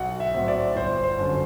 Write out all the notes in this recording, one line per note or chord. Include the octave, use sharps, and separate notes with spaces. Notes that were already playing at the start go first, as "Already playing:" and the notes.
Already playing: B1 F#5
E5
A2 F#3 C4
D5
G1 C5
C5
F#2 D3